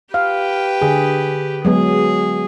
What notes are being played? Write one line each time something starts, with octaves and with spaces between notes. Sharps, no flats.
G4 B4 F5 G5
D3 G#4
F#3 G#3 B3 G#4